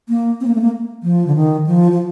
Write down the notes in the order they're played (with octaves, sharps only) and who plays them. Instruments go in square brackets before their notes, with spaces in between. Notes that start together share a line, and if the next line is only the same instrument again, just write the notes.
[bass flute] A#3
C4
A#3
A3
A#3
F3
D3
D#3
F3
F3